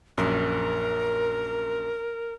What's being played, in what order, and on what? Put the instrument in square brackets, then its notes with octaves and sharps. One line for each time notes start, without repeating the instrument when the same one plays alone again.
[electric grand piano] A#1 F#2 [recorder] A#4